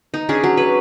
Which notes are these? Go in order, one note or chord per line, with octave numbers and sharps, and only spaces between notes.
D#4
C#4 D4 G#4
F#3
B4